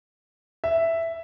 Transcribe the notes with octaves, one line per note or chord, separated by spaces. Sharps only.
E5